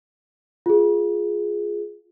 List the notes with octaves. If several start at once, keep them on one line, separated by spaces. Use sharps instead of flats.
F4 G#4